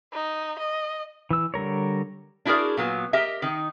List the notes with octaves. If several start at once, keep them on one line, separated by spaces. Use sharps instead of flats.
D#4
D#5
E3 E6
D3 G3 A#4 C#5
D4 E4 F#4 G#4 A#4 D5
A#2 F#3 B3
G4 A#4 D#5 E5
D#3 D#4